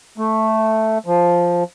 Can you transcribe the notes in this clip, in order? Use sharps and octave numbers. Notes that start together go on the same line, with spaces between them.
A3
F3